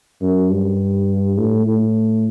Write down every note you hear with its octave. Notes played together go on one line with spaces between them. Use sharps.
F#2
G2
A2
A2